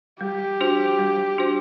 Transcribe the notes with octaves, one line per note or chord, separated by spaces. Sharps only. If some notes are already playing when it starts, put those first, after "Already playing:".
G3 G4
D4 F#4 C5
G3
D4 F#4 C5